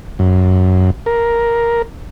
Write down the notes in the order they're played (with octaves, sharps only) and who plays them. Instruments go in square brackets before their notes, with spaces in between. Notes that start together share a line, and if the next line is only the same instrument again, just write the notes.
[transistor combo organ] F#2
A#4